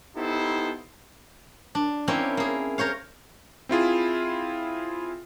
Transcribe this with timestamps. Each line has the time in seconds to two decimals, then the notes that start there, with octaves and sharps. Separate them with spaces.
0.16 B3 D#4 E4 G4 A4 C5
1.75 D4
2.08 A#3 C4 C#4 E4
2.37 A#3 G#4
2.78 A#4 C5 C#5 F5
3.69 C4 E4 F4 G#4